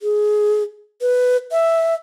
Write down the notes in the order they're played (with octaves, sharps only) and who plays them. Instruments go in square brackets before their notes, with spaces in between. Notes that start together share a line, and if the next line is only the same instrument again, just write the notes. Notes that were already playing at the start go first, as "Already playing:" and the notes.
[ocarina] G#4
B4
E5